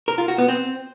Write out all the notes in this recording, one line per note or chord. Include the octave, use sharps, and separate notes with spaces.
A#4
F4
F#4
B3
C4